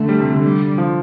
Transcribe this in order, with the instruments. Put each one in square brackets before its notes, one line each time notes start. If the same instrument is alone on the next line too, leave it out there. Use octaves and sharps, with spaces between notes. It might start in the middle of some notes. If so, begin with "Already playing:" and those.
Already playing: [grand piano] D3 [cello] A3
[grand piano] G3
C3
D3
[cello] G3
[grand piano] F3